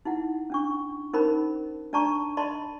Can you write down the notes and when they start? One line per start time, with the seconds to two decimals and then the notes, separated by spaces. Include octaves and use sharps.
0.05 D#4 E4 F#5
0.50 C#4 D4 C#6
1.13 C#4 D#4 A#4 C5 B5
1.93 D4 D5 A5 A#5 C#6
2.37 D5 D#5 A5 B5 C6